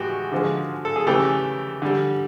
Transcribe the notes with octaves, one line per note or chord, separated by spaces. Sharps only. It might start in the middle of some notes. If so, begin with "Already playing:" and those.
Already playing: A2 E3 G#3 F#4 G4
D3 F3 G#3
A4
G#4
C#3 E3 A3 G4
D3 G3